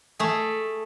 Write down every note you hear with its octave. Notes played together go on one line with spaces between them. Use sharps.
A3 G#4